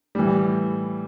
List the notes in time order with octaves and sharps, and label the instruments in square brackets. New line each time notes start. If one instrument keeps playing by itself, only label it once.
[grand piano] A2 E3 G3